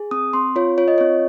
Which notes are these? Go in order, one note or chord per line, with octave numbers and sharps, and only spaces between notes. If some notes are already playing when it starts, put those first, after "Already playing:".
Already playing: G#4
C4 D#6
C4 C6
F4 C#5
F4 C#5
D#5
C4 C#5